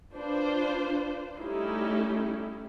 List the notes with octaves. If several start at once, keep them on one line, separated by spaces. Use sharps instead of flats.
D4 F4 B4 C5
G3 A3 C#4 D#4 E4 G4